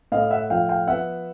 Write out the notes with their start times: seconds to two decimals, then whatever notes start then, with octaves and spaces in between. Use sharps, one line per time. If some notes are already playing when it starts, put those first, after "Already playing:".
0.12 A2 D#5 F5
0.31 E5 F#5
0.50 F3 F5 G5
0.69 F5 G5
0.88 B3 E5 F#5